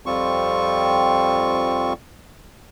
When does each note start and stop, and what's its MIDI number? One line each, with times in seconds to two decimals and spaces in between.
0.06 1.93 41
0.06 1.93 55
0.06 1.93 60
0.06 1.93 65
0.06 1.93 85